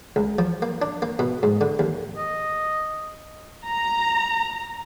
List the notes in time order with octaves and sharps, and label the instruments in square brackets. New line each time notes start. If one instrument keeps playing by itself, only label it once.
[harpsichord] C#2
F3
A#3
D4
A#3
B2
G#2
D3
D#2
[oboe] D#5
[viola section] A#5